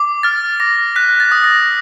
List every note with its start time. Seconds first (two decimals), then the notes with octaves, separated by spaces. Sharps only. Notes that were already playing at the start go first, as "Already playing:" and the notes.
Already playing: D6
0.23 F6 A6
0.60 D6 A#6
0.95 F#6 B6
1.20 A6
1.32 D#6
1.44 A#6